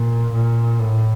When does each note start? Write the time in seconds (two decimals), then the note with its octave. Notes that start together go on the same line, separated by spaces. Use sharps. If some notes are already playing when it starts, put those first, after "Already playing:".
Already playing: A#2
0.33 A#2
0.80 A2